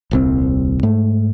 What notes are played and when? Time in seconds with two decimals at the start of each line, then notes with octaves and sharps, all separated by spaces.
0.11 D#1 C2 C4
0.83 G#2 A3